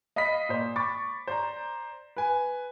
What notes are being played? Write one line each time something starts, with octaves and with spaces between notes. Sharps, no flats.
D#5 F5 B5 D#6 B6
A#2 C5
B5 C#6 D6 A6
C5 D5 A#5
B4 G#5